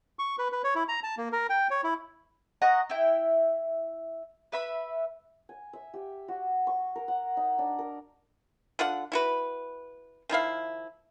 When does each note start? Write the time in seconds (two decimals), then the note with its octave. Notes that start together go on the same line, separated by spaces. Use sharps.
0.19 C#6
0.39 B4
0.52 B4
0.64 C#5
0.75 E4
0.88 A#5
1.03 A5
1.18 A#3
1.33 A#4
1.50 G5
1.71 C#5
1.84 E4
2.62 D#5 F#5 A#5 C#6
2.90 E4 G5
4.52 B4 E5 B5
5.49 G#5
5.73 E5
5.94 G4
6.28 F#4
6.67 C#6
6.95 A#4
7.08 F#5
7.37 D#4
7.59 D4
7.79 A#4
8.79 D3 F4 D5 F#5
9.12 E4 F#4 B4
10.29 D#3 F3 E4 F5